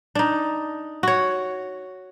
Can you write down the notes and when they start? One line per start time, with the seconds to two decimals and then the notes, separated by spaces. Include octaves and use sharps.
0.15 D4 D#4
1.03 F#4 C#5